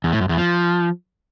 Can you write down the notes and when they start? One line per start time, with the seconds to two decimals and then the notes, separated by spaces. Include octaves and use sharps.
0.04 E2
0.12 A2
0.21 F#2
0.29 E2
0.38 F3